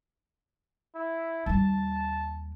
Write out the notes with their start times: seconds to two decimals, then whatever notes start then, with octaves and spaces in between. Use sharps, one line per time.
0.95 E4
1.46 D#2 G3 A5